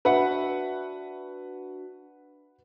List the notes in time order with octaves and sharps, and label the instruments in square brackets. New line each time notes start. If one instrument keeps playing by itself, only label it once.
[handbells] D4 F#4 [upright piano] B4 E5 F#5